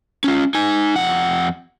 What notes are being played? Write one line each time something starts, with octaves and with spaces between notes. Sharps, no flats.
C#4 F4
D#4 G#5
F2 F#5